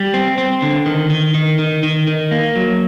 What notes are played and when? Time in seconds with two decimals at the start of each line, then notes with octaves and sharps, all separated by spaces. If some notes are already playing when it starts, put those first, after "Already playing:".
Already playing: G3
0.14 C4
0.38 C4
0.62 D3
0.86 D#3
1.10 D#3
1.34 D#3
1.59 D#3
1.83 D#3
2.07 D#3
2.31 A#3
2.56 F#3